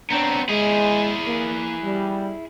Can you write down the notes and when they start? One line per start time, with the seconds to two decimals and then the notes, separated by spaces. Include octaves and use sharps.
0.10 B3 C4 D4 C#5 A#5
0.49 G#3 E4 G#4
1.26 A#3
1.83 G3